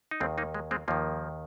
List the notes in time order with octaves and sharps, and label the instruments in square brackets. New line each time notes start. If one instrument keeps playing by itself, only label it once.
[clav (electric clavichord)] D#4
D#2 D#3 G#3 C4
A#3 D#4
G#3
G#3 C4
D#2 D#3 F3 A#3